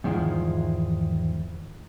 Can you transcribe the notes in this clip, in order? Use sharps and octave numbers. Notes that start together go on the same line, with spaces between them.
E2 G#2 D#3 F3 G#3 E4